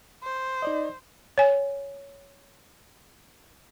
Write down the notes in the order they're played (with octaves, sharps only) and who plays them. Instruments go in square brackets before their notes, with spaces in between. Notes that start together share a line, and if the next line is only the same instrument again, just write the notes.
[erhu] C5
[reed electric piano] D#4 D5 D#5
[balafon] C#5 G#5